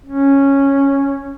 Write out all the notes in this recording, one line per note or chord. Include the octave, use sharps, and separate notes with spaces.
C#4